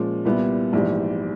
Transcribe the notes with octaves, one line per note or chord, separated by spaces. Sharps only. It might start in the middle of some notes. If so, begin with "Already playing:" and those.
Already playing: A#2 F3 G#3 C#4
C2 A#2 G3 B3 E4
A#1 G#2 E3 G3